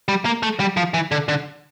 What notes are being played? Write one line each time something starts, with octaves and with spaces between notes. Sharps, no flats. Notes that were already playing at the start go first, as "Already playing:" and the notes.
G3
A#3
A3
G3
F3
E3
D3
D3